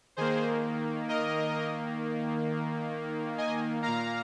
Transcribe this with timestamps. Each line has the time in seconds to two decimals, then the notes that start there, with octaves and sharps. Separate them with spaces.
0.17 D#3 A#3 G#4 C5
1.09 A#4 D#5
3.38 D#5 G#5
3.83 A#2 A#3 F5 A#5